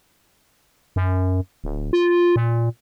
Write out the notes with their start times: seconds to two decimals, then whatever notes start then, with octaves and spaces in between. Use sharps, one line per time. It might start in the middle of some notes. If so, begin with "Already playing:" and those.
0.96 F#2
1.64 D1
1.93 F4
2.36 A#2